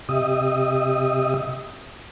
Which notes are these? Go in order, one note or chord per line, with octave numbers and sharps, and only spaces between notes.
C3 G4 D#5 E5 D#6